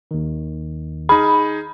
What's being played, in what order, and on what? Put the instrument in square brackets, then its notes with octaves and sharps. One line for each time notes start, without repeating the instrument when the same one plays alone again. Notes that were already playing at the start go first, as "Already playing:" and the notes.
[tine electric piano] D#2 D#3
[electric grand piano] D#4 G#4 [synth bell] B5